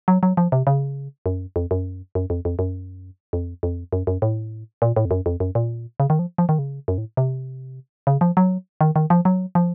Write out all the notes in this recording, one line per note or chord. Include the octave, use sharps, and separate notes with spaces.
F#3
F#3
F3
C3
C#3
F#2
F2
F#2
F#2
F2
F2
F#2
F2
F2
F#2
F#2
A2
A#2
A2
F2
F#2
F2
F#2
A#2
C#3
D#3
F3
F3
D#3
C#3
F#2
A2
C3
C#3
F3
F#3
D#3
D#3
F3
F#3
F3